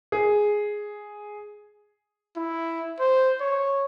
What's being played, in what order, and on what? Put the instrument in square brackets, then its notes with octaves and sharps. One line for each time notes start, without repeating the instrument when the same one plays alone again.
[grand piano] G#4
[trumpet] E4
C5
C#5